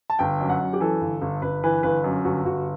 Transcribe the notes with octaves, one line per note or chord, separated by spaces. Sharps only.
A5
G1 G5
F#2
F#5
F#2
G4
E3 A4
G1
G1
G1 B4
E3 B4
G1 B4
F#2
G1 F#4
G1 F#4